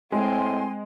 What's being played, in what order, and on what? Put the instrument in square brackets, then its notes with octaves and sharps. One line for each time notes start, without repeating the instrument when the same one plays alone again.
[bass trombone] A2 [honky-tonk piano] G#3 [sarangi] C4 [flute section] G#5 C6